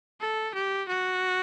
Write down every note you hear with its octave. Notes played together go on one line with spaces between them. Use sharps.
A4
G4
F#4